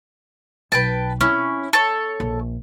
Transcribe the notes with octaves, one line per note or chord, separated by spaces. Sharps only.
B1 B4 G5 A5
C4 C#4 E4
A4 C#5
A#1